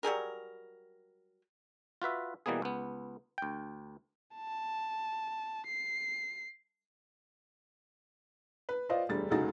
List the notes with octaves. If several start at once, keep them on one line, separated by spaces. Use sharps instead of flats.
F#3 G3 G#4 A#4
F4 F#4 B4 E5
B2 E3 G3 A#3 B3 G#4
C#2 B3
D2 G5
A5
C7
B4
F4 B4 C5 D5 D#5 F5
E1 D2 G3 A6
F1 C#2 G#3 D#4 F#4 A6